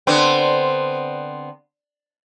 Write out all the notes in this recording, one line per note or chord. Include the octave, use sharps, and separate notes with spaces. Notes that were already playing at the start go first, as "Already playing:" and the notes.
D3 B3 C4